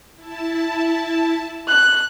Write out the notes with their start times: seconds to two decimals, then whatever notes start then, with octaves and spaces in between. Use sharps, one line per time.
0.15 E4 A5
1.69 F#6